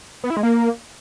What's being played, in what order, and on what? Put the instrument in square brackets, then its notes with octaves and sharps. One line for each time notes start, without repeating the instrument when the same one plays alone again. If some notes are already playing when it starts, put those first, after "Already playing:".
[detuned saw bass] B3
E4
G#3
A#3